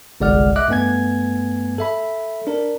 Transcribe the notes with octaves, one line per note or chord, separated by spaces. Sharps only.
G1 C2 G#3 D5 F#5 F6
D#5 E5 D6 F#6
G2 A3 B3 G#5 G#6
A4 E5 B5
D4 A#4